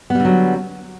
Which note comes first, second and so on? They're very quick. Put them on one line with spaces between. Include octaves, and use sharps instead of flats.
B3 G3 D3 F#3